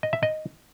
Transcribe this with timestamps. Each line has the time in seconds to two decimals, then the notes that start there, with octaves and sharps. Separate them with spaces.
0.03 D#5
0.13 E5
0.23 D#5